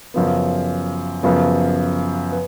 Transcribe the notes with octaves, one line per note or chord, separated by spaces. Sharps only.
F#2 C#3 F3 B3
F#2 C#3 F3 B3
B4